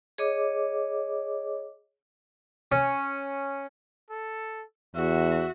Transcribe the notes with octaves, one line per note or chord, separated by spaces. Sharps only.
G#4 C#5 D#5 D6
C#4
A4
E2 F#4 E5